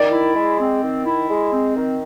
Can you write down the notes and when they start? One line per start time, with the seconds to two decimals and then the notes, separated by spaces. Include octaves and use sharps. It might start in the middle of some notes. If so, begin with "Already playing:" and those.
Already playing: D#3 D5
0.11 E4
0.34 G#3
0.59 C4
0.82 D#3
1.05 E4
1.29 G#3
1.52 C4
1.75 D#3